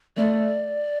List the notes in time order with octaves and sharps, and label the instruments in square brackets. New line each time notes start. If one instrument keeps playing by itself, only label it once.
[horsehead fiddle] A3 [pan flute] D5